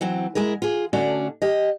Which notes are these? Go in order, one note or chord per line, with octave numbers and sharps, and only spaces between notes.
E3 F#3 C4
G#3 E4 G#4 A#4
F4 G#4
D3 A3 C#4 D4 F#4 D5
G4 D#5